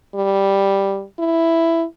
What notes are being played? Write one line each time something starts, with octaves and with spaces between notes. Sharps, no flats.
G3
E4